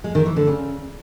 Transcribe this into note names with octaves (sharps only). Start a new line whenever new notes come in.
G#3
D#3
E3
D3
C#3